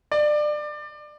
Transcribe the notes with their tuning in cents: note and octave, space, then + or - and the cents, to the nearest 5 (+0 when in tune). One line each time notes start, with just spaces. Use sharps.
D5 +25